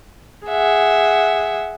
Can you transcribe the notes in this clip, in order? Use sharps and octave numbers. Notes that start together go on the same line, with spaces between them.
G#4 E5 F#5